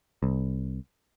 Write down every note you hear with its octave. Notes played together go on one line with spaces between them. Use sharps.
C2